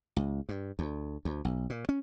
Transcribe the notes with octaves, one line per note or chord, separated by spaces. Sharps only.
C#2
G2
D2
D2
B1
A#2
C#4